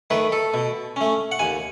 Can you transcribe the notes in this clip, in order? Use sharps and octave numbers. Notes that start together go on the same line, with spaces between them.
D#3 A3 B4
A4
B2
A3 C#4
F#5
D#2 G#5